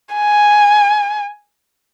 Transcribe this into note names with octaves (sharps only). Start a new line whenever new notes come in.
G#5